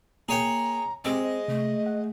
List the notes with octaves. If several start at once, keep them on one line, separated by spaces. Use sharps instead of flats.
A#3 G#4 C#5 G5 A#5
G#3 C4 G4 C5
D#5
C3 A3
F#5